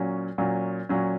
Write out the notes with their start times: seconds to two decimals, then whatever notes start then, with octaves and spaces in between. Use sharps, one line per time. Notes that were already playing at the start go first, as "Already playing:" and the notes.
Already playing: A#2 F#3 C#4
0.38 A#2 F#3 C#4
0.89 A#2 F#3 C#4